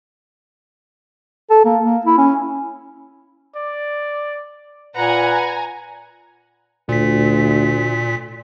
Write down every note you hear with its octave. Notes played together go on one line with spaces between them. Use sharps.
A4
A#3
A#3
E4
C#4
D5
A#2 B4 F#5 G#5 A#5
D2 A#2 B6